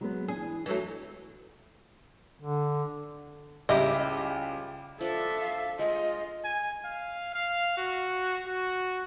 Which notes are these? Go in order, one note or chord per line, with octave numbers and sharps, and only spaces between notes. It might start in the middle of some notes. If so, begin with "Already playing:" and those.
F#3 G#3 B3
E3 D4 G#4
E3 F#3 A3
D3
C#2 G3 E4 G4 D#5 B5 D6
F3 D4 A4 E5
F5
G#3 F4 D#5
G#5
F5
F5
F#4
F#4